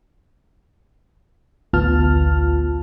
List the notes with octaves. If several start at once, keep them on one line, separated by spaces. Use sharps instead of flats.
A1 D2 B3 F4 A5 F6